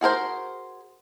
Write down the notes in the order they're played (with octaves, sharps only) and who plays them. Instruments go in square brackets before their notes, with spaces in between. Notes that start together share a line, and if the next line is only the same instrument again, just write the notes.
[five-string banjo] F#4 G#4 A#4 C5